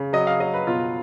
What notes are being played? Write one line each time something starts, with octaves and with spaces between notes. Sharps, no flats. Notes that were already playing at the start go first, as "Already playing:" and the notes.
Already playing: C#3
F#3 D#5
F5
F#3 D#5
B4
B2 F4